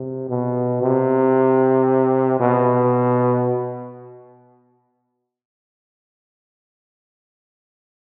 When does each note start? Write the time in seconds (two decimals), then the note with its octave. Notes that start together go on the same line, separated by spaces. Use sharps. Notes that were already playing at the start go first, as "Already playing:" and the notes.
Already playing: C3
0.29 B2
0.82 C3
2.40 B2